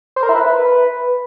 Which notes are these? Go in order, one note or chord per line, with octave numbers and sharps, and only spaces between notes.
C5
A#4
E4
B4